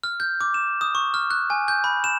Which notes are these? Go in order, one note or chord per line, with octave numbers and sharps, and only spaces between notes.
F6
G6
D6
E7
D#6
C#6
F6
F#6
G#5
G6
B5
E7